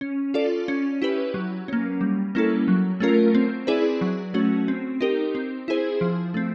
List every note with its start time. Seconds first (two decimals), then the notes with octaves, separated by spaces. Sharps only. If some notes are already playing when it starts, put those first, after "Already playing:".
0.01 C#4
0.34 F4 A4 D5
0.68 C#4
1.02 E4 G4 B4
1.34 F#3
1.68 A#3 C#4
2.01 G3
2.35 A#3 C#4 E4 A4
2.68 F#3
3.00 A3 C#4 F4 A#4
3.35 C4
3.67 E4 G#4 B4 D5
4.01 F#3
4.34 A3 C#4 F#4
4.68 C4
5.01 D#4 G4 A#4
5.35 C4
5.68 E4 G#4 C5
6.01 F3
6.34 A3 C4